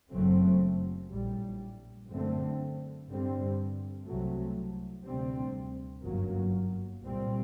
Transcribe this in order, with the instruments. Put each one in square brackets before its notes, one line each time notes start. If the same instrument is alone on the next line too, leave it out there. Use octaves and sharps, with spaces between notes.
[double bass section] F#1 F#2 F#3 A3 C4
A#1 A2 G3
F#2 D3 A3 C4
G2 D3 G3 C4
C2 C3 F#3 A3
D2 C3 G3 C4
G1 F#2 F#3 A#3
C2 A#2 G3 C4